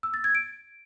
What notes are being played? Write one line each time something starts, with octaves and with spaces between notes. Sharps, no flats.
E6
A6
G#6
D7